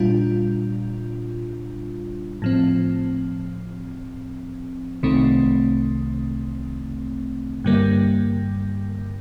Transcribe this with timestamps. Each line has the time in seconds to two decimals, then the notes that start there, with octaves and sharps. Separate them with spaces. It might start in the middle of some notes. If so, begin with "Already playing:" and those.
Already playing: A#2 G3 D4 F4
2.42 A2 F3 C4
5.03 C2 C3 D#3 A3 C4
7.64 G2 D3 G3 A#3